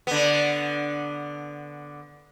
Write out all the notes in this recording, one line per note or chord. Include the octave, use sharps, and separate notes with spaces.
D3 B3